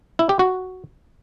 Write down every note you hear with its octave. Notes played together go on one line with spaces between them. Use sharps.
E4
G4
F#4